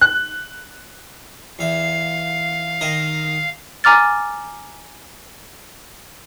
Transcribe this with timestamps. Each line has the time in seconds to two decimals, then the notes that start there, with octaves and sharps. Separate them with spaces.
0.01 F#6
1.59 E2 E5 F5
2.81 D#3 A#4 D#5
3.84 G#5 A#5 D6 F6 A6